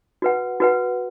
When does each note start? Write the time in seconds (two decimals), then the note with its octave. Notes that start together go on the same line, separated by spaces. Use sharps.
0.22 F#4 B4 F#5
0.60 F#4 B4 F#5